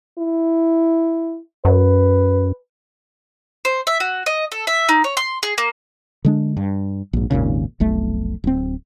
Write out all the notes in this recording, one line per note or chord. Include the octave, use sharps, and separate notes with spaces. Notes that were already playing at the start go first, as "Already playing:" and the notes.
E4
F#2 B4
C5
E5
F#4
D#5
A4
E5
D#4
C#5
C6
G#4
A#3
D3 G#3 D4
G2
A#1 G#2
G#1 D#2 A#2 C#3
F1 B1 A3
D1 C4